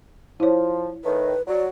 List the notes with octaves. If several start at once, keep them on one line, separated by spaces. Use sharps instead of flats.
F3 E4 C#5
A2 D#3 B4
F#3 D5